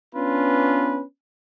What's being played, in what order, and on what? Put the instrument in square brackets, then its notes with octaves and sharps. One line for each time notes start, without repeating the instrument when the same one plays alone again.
[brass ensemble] B3 C#4 D4 F4 B4